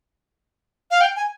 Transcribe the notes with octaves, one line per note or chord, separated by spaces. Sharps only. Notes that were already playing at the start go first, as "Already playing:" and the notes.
F5
G5
G#5